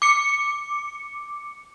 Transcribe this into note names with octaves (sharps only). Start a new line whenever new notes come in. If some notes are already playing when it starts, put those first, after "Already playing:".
D6 C#7